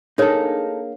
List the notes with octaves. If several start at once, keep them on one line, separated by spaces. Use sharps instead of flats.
A#3 D4 D#4 G#4 A4 C#5